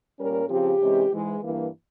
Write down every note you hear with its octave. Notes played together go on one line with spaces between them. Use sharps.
A#2 G3 C#4 A#4
C#3 F3 C4 G4
C3 E3 G#3 C#4
G#2 E3 G#3
G2 E3 A#3